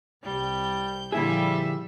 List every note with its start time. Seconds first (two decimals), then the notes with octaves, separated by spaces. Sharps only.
0.23 C2 G3 G6
1.12 A#2 D3 F3 G3 E4 G#4 E5